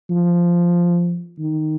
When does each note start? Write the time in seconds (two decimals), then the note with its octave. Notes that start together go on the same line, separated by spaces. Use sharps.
0.10 F3
1.39 D#3